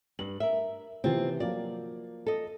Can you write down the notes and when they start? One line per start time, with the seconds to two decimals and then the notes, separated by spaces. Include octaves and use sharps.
0.19 G2 F#7
0.40 A#4 E5
1.04 C3 E3 B3 C4 F4
1.40 F3 F#3 A#3 D5
2.27 A4 D#5